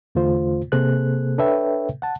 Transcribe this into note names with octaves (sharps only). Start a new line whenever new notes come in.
E2 D3 A3 F4 C5
C3 A#3 G#4 A4 C5 F#6
D4 A4 B4 C#5 E5 G5
F#5 A5